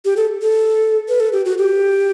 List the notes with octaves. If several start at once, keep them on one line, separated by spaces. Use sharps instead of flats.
G4
A4
A4
B4
A4
G4
F#4
G4